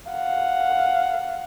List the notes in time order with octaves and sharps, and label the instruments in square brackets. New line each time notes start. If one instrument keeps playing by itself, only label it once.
[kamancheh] F5 F#5